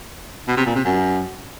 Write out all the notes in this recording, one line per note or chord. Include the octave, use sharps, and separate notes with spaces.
B2
C3
A#2
C3
F#2